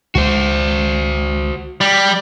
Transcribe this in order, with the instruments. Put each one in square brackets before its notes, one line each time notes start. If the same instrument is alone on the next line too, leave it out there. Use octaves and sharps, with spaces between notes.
[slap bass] C#2 G#3 [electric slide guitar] F#4 C5
[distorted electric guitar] G3